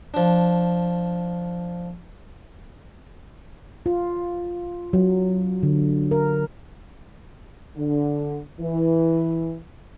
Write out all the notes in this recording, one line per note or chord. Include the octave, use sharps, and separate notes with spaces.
F3 D4
F4
F#3
D3
A#4
D3
E3